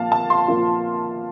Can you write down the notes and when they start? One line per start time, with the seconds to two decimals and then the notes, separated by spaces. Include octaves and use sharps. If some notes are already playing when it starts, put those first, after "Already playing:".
Already playing: A#2 F3 A#3 F4 F5 A5
0.12 A5
0.30 C6
0.48 A#2 F3 A#3 F4